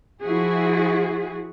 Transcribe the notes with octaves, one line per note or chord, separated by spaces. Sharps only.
F3 E4 F#4 G#4